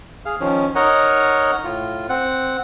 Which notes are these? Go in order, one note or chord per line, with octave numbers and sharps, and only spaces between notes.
G#4 F5
D#3 F3 C#4
D#4 A#4 C#5 D#5 F#5
A2 F4
C4 F#5